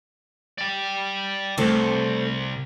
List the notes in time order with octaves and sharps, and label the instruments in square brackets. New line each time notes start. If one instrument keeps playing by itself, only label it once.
[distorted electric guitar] D5 G5
[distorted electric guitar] C2 [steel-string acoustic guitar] A3 A4 C5